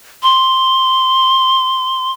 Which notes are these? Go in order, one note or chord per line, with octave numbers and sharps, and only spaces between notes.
C6